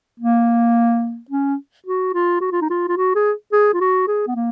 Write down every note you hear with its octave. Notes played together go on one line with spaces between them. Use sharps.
A#3
C#4
F#4
F4
F#4
F4
D#4
F4
F4
F#4
G#4
G#4
F4
F#4
G#4
B3
A#3